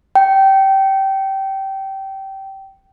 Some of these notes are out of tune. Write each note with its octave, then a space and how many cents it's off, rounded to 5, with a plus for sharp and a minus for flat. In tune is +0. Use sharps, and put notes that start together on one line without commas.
G5 -20